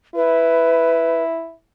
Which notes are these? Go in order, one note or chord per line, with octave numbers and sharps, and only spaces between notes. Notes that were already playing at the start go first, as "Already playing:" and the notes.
E4 B4